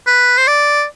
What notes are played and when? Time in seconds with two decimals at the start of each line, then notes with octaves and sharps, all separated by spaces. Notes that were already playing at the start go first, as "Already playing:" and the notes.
0.06 B4
0.38 C5
0.47 D5